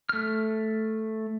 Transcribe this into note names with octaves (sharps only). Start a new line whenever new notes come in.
A3 F6